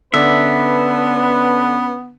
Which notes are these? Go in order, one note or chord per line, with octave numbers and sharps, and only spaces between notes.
D3 B3 C#4 D4 B4 E5